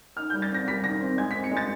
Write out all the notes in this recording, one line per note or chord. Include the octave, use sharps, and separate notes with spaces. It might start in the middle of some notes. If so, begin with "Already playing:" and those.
D#4 F6
G6
G3
A6
C4 A#6
G3 B6
D#3 A#6
C4
G#3 G#6
B6
C4
C#7
G#3
A6